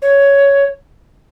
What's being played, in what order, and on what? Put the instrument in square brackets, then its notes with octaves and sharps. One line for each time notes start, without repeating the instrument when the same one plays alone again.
[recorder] C#5